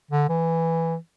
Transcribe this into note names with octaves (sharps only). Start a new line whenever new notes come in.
D3
E3